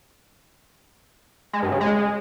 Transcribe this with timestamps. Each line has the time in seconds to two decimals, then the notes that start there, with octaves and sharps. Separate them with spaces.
1.53 G#3
1.62 G2
1.72 C#3
1.81 G#3